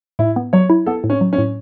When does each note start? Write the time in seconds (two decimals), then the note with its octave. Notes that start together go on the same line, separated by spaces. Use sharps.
0.19 A2 E4
0.36 B3
0.53 F#3 C#5
0.70 E4
0.86 B3 A4
1.04 A2
1.10 C#4
1.21 F#3
1.33 C#4
1.38 A2